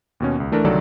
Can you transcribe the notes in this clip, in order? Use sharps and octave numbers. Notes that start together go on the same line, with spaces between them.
D#2 B2 C#4
C#2
E3 A3 D4 A#4
C2 D3 D#3 F#3 A4 D5